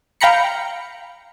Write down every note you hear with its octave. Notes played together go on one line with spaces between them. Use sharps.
F5 G5 A#5 B5 C#7